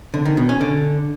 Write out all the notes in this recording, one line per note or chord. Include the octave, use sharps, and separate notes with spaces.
D3
D#3
B2
C#4
D3